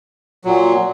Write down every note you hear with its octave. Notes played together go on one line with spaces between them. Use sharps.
A#2 F#3